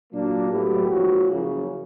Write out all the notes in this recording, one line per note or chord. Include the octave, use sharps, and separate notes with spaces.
A#2 F#3 A#3 D4
A2 F#3 B3 E4 G4
G#2 F3 A#3 C#4 F#4
F#1 F#2 C#3